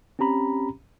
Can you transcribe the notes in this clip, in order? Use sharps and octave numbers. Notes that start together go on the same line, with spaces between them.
C4 C#4 G4 A#5 B5